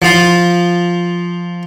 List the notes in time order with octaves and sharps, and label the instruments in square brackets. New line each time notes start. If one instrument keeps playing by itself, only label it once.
[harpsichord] F3 F4